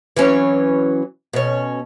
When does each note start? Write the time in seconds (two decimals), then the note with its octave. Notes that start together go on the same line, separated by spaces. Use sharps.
0.17 E3 F#3 C#4
1.33 B2 C#4